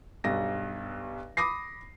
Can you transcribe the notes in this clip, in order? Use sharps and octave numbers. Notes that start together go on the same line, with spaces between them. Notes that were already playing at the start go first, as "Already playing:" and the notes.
B1 G2 A#6
B5 D6 D#6 A#6 C7